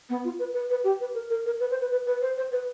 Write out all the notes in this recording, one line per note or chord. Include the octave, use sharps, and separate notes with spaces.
B3
F4
B4
B4
B4
G4
B4
A#4
A#4
A#4
B4
C5
B4
B4
B4
C5
C5
B4